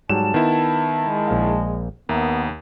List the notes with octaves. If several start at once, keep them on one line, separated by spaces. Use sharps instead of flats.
G#2 F#3 G3 A5 E7
D#3 B3 E4
G#3
A#1 F5
D#2 B3 A#4 E5 A#5